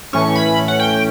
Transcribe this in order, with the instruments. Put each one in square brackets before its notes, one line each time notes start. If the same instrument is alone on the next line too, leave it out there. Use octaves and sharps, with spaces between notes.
[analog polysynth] A2 E3 A3 C#4 C#6
B5
F#5
G5